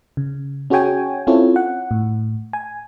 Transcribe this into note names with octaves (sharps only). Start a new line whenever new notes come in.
C#3
C#4 F#4 G#4 C#5 G5 G#5
C4 C#4 E4 F4 A4 C#5
F#5
A2
G#5